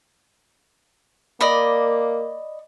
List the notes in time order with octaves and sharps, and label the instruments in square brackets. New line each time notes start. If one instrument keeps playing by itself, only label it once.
[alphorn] A#3 [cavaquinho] D5 D#5 B5